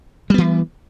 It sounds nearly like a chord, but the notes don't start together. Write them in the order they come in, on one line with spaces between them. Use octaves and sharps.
G3 B3 E3